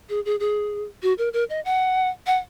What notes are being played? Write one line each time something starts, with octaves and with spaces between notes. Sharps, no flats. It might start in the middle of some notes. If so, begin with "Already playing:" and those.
G#4
G#4
G#4
F#4
A#4
A#4
D#5
F#5
F#5